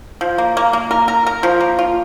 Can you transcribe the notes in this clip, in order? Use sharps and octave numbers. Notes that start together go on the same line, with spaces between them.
F3
A#3
A#3
A#3
A#4
A#4
A#4
F3
A#3
F4